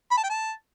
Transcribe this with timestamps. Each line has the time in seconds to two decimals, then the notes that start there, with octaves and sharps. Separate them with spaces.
0.11 B5
0.17 A5
0.23 G5
0.29 A5